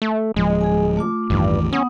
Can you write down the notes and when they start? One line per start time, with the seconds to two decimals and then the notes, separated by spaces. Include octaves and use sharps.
0.02 A3
0.36 D1 F3 G#3
0.61 G#4 G#5
0.97 A3 F4 D6
1.30 A1 E2 G2 D#3
1.72 B3 C#4 F#5 D#6